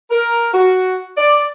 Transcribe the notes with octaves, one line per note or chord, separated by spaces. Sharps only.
A#4
F#4
D5